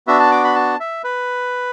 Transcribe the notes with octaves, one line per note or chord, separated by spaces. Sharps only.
B3 D4 F#4 E5
A5
D6
B5
A5
E5
B4